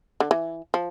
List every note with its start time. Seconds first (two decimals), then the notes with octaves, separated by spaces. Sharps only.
0.20 D3
0.31 E3
0.74 F3